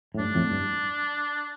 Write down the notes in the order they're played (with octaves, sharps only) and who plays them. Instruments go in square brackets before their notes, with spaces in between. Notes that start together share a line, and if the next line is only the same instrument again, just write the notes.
[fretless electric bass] A2
[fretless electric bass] G2 [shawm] D4
[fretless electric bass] F2 A2
G2